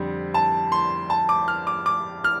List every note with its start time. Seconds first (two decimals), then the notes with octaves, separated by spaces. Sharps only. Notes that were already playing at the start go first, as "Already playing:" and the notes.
Already playing: F2 D3 G3 C4
0.34 A5
0.72 C6
1.10 A5
1.29 D6
1.48 F6
1.67 D6
1.86 D6
2.24 F6